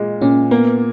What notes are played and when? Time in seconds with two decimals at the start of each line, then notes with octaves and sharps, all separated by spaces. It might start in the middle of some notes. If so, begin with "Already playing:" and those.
Already playing: A#2 G#3
0.21 A#2 C#4
0.51 A#3 B3